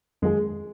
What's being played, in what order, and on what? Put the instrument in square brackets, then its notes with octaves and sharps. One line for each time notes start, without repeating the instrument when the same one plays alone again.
[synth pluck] F2 D#3 A#3 F4 G#4 [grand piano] G#3